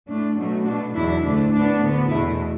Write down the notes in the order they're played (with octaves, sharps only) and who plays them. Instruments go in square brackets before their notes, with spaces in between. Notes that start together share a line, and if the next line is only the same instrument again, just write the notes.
[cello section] A2 A3 D4
B2 F#3 A3
B2 A3 D4 F#4
E2 B2 F#3 D4 E4
D2 D3 A3 D4
A2 F#3 B3 D4
D2 D3 B3
E2 B2 A3 E4